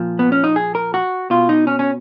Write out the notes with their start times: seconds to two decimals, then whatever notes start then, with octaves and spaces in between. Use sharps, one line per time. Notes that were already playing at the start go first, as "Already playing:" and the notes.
Already playing: A#2 F3
0.19 B3
0.32 C#4
0.44 D#4
0.56 G#4
0.75 A#4
0.94 F#4
1.30 B2 F4
1.49 D#4
1.67 C#4
1.79 C#4